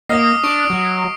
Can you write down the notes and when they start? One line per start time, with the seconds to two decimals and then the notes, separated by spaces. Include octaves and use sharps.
0.09 A#3 D#5 D#6 F6 C7
0.44 D4 C#6 D7
0.70 F#3